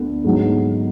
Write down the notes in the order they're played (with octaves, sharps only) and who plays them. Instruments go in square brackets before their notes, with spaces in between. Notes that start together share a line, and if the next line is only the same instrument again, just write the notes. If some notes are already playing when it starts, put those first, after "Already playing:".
Already playing: [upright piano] D2 B3
G#2 F#3 B3